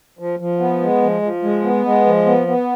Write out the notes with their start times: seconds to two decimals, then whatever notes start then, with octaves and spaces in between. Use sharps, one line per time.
0.19 F3
0.40 F3
0.59 B3
0.81 G#3
1.02 F3
1.22 F3
1.43 G#3
1.64 B3
1.85 G#3
2.06 F3
2.26 B3
2.47 B3